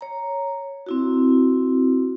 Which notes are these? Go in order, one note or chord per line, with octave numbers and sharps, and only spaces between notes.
C#5 A#5
C4 E4 F#4